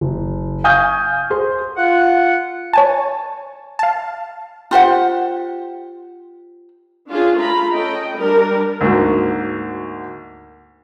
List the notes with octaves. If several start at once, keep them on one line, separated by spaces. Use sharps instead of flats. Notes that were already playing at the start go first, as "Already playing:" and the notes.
F#1
F5 G#5 C#6 D#6 F6 G6
G#4 C5 C6
F4 F#5
C#5 G#5 A5
F5 A5
F4 G4 C5 F#5
C#4 D4 F4 G#4
A3 F4 A#5 B5
C#4 A4 D#5 G5
G3 D4 A#4
D2 G#2 A#3 F#4